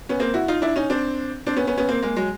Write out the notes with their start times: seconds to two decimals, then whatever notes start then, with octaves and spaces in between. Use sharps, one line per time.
0.09 B3 C#4
0.20 A#3 C4
0.34 E4 F#4
0.48 D#4 F4
0.62 D4 E4
0.76 C#4 D#4
0.90 C4 D4
1.47 C4 D4
1.57 B3 C#4
1.67 B3 C#4
1.77 B3 C#4
1.89 A#3 C4
2.02 G#3 A#3
2.16 F#3 G#3